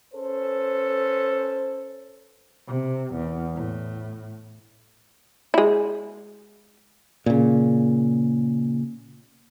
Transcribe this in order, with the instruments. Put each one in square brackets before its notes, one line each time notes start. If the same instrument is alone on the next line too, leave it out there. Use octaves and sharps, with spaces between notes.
[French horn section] C#4 A4 B4 C5
[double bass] C3
E2
A2
[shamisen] G#3 E4
[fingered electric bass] A#2 C#3